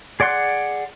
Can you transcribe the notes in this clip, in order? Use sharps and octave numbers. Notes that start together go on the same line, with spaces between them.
G#4 D5 F#5 C6 F#6